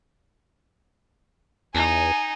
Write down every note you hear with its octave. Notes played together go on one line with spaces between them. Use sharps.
E2 D#4 G#5